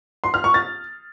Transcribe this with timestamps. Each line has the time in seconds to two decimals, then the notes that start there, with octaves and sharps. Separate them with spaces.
0.24 C6
0.34 F6
0.44 C#6
0.54 A6